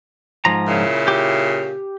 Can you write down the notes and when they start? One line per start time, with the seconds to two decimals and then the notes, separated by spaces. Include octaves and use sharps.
0.45 G#2 F3 A#5
0.67 A#2 C#3 E4
1.08 G4